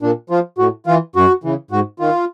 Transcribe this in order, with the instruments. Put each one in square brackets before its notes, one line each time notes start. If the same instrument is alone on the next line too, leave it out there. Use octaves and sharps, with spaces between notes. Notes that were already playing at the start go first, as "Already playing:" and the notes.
[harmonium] A#2 D4
F3 F4
A2 F#4
E3 F4
F#2 F#4
C#3 E3
G#2 F#4
D#3 F4